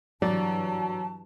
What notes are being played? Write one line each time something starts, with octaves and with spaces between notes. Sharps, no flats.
G2 E3 F#3 D5 A5